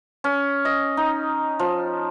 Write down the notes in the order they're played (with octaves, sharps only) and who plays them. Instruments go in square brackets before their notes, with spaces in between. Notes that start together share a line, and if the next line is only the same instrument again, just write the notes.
[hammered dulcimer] C#4
D#5
D#4
F3